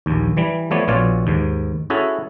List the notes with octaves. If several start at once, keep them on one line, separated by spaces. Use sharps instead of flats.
A#1 D#2
E3 G3
F3 A3 B3 C#5 D5
A#1 B2 F4 C#5 D5
D#2 G#2
C#4 E4 F#4 G#4 A4 E5